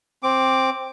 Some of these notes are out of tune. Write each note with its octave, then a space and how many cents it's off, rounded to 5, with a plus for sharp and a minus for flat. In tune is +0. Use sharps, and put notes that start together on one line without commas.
C4 +10 D6 +0